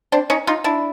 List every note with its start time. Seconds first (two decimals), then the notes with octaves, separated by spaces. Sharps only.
0.12 C4 D4
0.30 C#4 D#4
0.47 D#4 F4
0.64 D4 E4